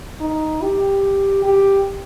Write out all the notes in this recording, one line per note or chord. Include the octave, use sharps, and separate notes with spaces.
D#4
G4
G4